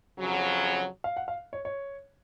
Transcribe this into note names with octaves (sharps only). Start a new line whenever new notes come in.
F2 C#3 F#3
F5
F#5
F5
C#5
C#5